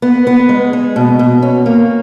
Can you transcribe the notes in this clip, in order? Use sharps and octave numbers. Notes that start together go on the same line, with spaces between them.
B3
B3
G#3
G#3
B2
B2
C#4
A#3